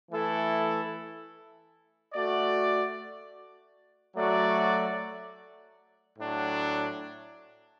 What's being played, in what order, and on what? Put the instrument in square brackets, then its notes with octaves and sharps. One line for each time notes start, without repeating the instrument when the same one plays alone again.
[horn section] E3 A3 E4 A4
A3 F#4 D5
F#3 A3 F#4 D5
A2 F#3 D4